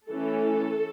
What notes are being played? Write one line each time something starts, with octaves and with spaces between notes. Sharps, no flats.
E3 A3 C#4 A4